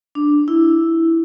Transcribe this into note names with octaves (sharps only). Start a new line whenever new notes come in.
D4
E4